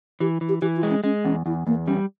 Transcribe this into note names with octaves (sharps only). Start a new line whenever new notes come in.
E3 G4
E3
G4
E3 G4
F4
G#3
C#4
G#3 C#4
E2 C#4
E2 E4
E2 A#3
G3 C#4